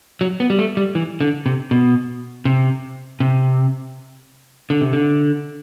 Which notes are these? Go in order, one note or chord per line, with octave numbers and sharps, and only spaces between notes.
F#3
B3
G3
A3
G3
E3
D3
C3
B2
C3
C3
D3
C3
D3